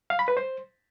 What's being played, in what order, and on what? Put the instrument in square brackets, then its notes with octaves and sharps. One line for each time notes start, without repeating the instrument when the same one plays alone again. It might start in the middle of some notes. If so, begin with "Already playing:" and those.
[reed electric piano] F5
B5
B4
C5